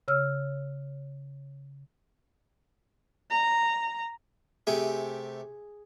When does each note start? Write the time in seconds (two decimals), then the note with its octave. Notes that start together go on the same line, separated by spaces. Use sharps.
0.08 C#3 C#5 E6 F6
3.30 A#5
4.67 C3 A3 G4 G#4